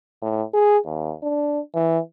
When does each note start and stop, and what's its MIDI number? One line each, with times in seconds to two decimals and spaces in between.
0.22 0.43 45
0.54 0.79 68
0.86 1.15 39
1.23 1.60 62
1.75 1.99 52